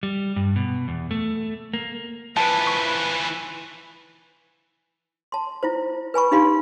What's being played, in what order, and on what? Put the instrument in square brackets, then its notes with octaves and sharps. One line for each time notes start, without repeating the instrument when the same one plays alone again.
[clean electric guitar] G3
G2
B2
E2
A3
A#3
[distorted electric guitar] E3 F3 [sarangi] B4 [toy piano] A5
[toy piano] C#6
A5 C6
E4 F4 C5
B4 G#5 B5 C#6
D4 D#4 G4 F5 B5 C6